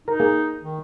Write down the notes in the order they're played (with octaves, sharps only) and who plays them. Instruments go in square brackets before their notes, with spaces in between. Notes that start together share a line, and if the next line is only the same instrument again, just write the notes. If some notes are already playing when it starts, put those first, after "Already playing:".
[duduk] D#4 [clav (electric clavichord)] A#4 A#5
[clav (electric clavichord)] A#3 G#4
[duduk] D#3